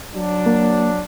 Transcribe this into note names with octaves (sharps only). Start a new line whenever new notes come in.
F#3 D4
A#3